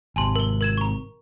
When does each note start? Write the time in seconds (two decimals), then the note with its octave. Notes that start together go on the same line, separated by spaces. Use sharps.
0.16 G#1 C3 G#5 A5 C6
0.36 A#4 G7
0.61 A#4 G#6 E7
0.78 A#5 C#6